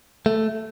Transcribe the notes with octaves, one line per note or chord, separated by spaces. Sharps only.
A3